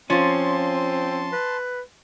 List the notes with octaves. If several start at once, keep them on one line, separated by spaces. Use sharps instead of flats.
F3 C4 C#4 F4 A5 C6
B4